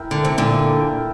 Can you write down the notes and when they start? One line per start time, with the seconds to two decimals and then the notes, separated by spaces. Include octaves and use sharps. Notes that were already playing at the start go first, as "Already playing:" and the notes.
Already playing: E4 A#4 E5 G5
0.11 D3
0.25 C3
0.38 A#2 D3